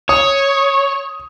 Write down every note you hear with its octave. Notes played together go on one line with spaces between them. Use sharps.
C#5 D#6